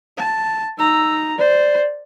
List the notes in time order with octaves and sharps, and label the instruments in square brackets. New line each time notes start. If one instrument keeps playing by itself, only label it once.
[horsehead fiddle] A5
[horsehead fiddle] D#4 A#5 [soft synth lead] E6
[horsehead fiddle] C5 [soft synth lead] D5